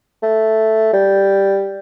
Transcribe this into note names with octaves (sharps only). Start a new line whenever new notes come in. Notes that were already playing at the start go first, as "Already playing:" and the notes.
A3
G3